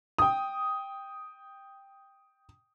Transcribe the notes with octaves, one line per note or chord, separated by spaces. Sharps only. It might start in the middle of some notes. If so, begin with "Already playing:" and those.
G5 D#6